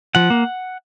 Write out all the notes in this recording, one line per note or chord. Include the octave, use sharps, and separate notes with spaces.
F3 F#5
A#3